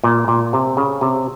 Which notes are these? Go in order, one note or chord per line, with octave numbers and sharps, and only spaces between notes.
A#2
A#2
C3
C#3
C3